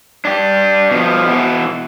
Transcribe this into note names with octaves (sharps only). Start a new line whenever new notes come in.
D4 G4
B2 F3
B2 E3